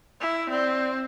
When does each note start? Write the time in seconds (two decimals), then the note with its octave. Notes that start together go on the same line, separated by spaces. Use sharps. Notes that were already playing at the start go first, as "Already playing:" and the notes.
0.21 E4
0.50 C4 D5